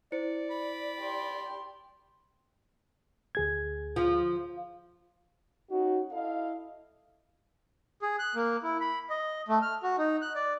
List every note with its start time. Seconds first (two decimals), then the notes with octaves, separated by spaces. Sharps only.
0.12 E4 C5 D5 C#7
0.51 B5
1.00 G4 C6
3.35 D2 G#4 G#6
3.96 F3
5.70 C#4 D#4 F#4
6.12 E4 A4 D#5 F5
8.02 G#4
8.19 F#6
8.35 A#3
8.63 E4
8.81 B5
9.10 D#5
9.48 A3
9.62 F6
9.83 F#4
9.98 D#4
10.22 F#6
10.35 D5